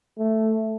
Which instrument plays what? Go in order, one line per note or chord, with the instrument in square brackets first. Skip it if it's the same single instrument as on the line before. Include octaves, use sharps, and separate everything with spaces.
[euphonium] A3